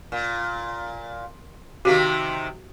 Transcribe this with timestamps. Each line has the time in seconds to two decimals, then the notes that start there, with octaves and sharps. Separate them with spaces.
0.12 A#2
1.85 C3 D#3 F#4 G4 F5